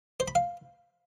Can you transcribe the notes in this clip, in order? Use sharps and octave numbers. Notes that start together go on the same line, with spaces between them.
C5
B5
F5